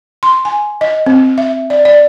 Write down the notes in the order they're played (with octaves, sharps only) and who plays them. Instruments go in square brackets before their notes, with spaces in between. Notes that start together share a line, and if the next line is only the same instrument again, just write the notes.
[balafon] C6
G#5
D#5
C4
E5
D5
D5